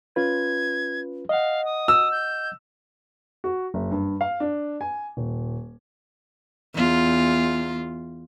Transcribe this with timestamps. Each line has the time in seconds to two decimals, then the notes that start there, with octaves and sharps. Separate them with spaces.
0.16 C#4 F4 B4 G#6
1.29 D#5 F5 F#5
1.65 D#6
1.88 E6
2.11 G6
3.44 F#4
3.74 F#1
3.91 G2
4.21 F5
4.40 D4
4.81 G#5
5.17 D#1
6.75 E2 F4